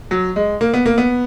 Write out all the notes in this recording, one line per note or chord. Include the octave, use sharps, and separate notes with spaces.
F#3
G#3
A#3
B3
A#3
B3